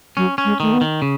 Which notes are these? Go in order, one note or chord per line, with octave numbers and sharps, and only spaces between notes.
F#3 C#4
C#4
G#3
D#3 A3
B3
D#3
C#3